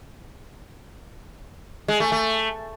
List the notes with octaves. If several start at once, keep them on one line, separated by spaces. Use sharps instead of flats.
G#3
A3
A3